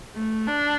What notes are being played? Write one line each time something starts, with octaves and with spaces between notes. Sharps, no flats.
A3
D4